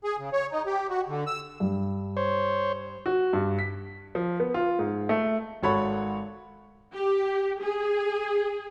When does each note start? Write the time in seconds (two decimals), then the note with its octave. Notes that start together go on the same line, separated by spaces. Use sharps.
0.04 G#4
0.19 C#3
0.33 C#5
0.52 D#4
0.66 G4
0.90 F#4
1.08 D3
1.26 E6
1.60 G2
2.17 C5 C#5
3.06 F#4
3.33 G2
3.59 B6
4.15 F3
4.40 B3
4.54 F4
4.79 G#2
5.09 A3
5.63 G#1 F#4 A4 C#5 F#5 B5
6.94 G4
7.61 G#4